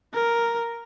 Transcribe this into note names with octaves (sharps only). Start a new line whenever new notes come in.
A#4